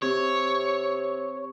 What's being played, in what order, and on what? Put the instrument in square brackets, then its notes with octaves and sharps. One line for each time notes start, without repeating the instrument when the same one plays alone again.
[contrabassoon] C3 [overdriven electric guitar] C#5